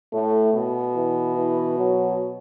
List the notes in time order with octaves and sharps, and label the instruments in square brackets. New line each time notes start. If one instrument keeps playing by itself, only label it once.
[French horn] A2 [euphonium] A3
[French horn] B2
[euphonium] E3
E3
F#3